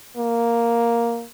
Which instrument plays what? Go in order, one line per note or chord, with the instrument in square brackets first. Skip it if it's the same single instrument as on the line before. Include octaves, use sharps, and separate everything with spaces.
[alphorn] A#3